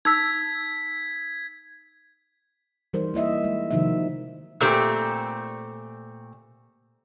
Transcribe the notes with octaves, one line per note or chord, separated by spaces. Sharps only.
D#4 E6 G#6 B6
E3 G3 D#4 A#4 C5
A#3 E4 D#5 E5
G#3
C3 D#3 F3 D#4 F#4 E5
A#2 A3 C4 G4